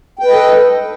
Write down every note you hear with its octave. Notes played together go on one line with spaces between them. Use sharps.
A4 B4 D#5 G5